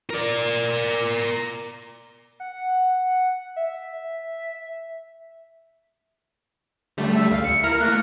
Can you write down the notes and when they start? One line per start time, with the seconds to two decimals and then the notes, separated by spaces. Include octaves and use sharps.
0.10 A#4 D5
2.40 F#5
3.56 E5
6.97 D3 G3 A3
7.15 E5
7.31 D2 F5
7.44 C#7
7.63 E4 A#4 A#5 F6
7.80 A3 A#3 F#6